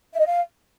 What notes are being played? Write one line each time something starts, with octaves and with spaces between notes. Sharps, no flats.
E5
D#5
F5